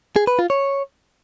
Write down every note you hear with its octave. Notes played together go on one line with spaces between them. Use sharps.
G#4
B4
F4
C#5